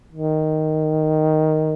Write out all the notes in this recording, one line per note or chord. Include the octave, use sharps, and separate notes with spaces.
D#3